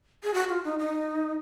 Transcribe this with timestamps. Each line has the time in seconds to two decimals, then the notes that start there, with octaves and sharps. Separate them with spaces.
0.23 G#4
0.34 F#4
0.49 F4
0.65 D#4
0.79 D#4